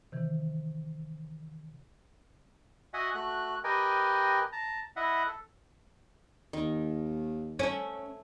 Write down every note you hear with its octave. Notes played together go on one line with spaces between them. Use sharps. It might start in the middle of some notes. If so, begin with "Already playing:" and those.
C3 D#3 E3
F#4 D#5 E5 F#5 G#5
A3 F#4 F#6
G4 A#4 B4 D#5 G5 G#5
A5 A#5
E4 D#5 E5 F#5
A4
D#2 D#3
A3 C#4 E5